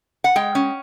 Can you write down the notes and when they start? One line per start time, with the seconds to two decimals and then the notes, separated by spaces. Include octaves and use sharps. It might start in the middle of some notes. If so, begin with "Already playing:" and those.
0.24 F#5
0.36 G#3 G5
0.55 C#4